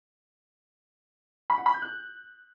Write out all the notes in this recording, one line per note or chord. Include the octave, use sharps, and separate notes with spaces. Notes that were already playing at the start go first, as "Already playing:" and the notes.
B5
F#5
B5
G6
F#6